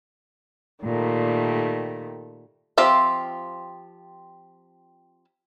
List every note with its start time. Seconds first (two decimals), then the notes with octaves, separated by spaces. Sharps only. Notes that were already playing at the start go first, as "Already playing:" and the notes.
0.84 A#2 D#3 G3 A3
2.78 F3 C4 F4 G4 E5